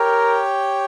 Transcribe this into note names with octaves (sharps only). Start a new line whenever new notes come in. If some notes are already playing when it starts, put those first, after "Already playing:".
Already playing: G4 A#4 C#5 G5